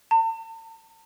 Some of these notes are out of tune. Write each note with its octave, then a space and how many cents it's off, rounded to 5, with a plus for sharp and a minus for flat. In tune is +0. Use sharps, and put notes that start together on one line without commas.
A5 +45